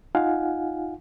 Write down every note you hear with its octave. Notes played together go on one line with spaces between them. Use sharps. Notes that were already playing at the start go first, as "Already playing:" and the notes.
D#4 F4 F5 F#5 G#5